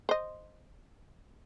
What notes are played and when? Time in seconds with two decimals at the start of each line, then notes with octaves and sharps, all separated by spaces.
0.09 C5 D#5